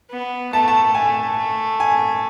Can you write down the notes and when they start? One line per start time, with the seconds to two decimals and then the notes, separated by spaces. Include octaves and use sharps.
0.10 B3
0.53 A3 A5
0.68 A5
0.95 A3 G#5
1.37 A3
1.80 G#5